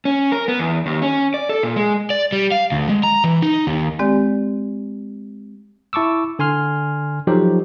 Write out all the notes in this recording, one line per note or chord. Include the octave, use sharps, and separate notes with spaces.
C#4
A#4
B3
E2
D#2
C#4
D5
A4
A#2
G#3
D5
G3
F5
D2
G#3
A#5
E3
D#4
D#2
G#3 C4 G4 D5
E4 A5 C#6 D6 E6
D3 G#5 C6 F6
F3 F#3 D#4 G4 A4 C5